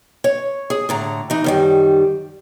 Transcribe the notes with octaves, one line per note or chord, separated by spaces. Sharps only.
C#5
G#4
A2 D3 A#5
E3 D#4
F#2 D#3 G3